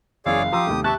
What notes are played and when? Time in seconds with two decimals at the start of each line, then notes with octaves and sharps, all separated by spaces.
0.26 F#1 E3 G#4 C#5 D5 F5 E6
0.52 F3 G4 A#5 C6 D#6 E6
0.67 D#2 G#2 C3 A3
0.84 G4 E5 A5 C#6 F#6